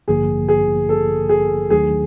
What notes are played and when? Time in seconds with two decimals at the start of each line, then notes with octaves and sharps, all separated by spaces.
0.08 A1 G2 D3 F3 A#3 G#4
0.48 G#4
0.89 A4
1.29 G#4
1.70 D#2 D#3 F#3 A3 D4 G#4